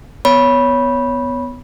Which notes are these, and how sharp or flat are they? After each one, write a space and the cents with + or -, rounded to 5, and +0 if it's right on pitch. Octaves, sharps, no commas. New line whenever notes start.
B3 +10 C#5 +10 B5 -15